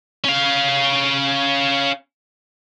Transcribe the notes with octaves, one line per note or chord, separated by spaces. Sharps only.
C#4 F5